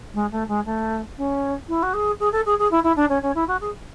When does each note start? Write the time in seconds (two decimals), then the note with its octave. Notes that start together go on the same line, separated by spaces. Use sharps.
0.14 G#3
0.31 A3
0.48 G#3
0.65 A3
1.17 C#4
1.68 E4
1.82 F#4
1.93 G#4
2.19 G#4
2.32 A4
2.45 G#4
2.58 G#4
2.71 E4
2.83 E4
2.96 D4
3.09 C#4
3.22 C#4
3.35 E4
3.47 F#4
3.60 G#4